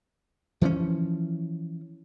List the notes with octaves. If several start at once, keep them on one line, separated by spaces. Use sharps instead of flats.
E3 F3 G#3 C#4